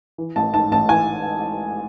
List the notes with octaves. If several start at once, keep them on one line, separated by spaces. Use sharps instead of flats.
E3
A1 A5
G#2 A5
A1 A5
E3 G#5